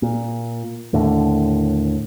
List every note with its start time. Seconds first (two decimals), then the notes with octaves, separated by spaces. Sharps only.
0.02 A#2
0.93 D#2 A2 D3